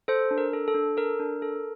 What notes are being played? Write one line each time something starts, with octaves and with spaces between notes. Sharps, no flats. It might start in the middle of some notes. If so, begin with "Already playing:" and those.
A4 C5
D4
A#4
A4
A4
D4
A4 A#4
D4
A4